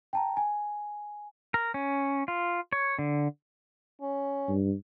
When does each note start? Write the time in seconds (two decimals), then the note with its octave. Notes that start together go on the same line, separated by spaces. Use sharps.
0.13 G5 A5 A#5
0.37 G#5
1.54 A#4
1.74 C#4
2.28 F4
2.73 C#5
2.99 D3
4.01 C#4
4.49 G2